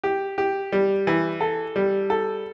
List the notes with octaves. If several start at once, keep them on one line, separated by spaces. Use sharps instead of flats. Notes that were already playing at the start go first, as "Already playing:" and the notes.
G4
G4
G3
E3
A4
G3
A4